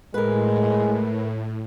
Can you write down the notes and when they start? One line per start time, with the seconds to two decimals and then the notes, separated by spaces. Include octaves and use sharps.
0.14 A2 G#3 A#4 B4